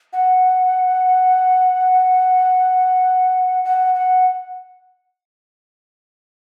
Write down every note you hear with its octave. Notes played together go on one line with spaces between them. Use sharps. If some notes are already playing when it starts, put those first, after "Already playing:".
F#5
F#5
F#5